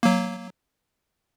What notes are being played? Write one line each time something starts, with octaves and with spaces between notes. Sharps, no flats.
F#3 A#3